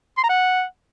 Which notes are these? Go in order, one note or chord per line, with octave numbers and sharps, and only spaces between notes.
C6
A#5
F#5